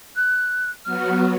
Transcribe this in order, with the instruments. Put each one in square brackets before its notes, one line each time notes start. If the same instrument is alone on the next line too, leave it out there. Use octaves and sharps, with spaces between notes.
[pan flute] F#6
[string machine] F#3 B3 F#4 [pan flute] F6